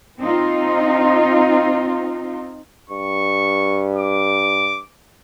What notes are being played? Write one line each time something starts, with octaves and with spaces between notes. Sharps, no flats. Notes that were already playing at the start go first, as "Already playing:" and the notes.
C4 D#4 F4
G2 C#6
D6